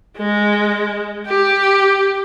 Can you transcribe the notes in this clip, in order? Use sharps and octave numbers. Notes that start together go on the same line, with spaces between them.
G#3
G4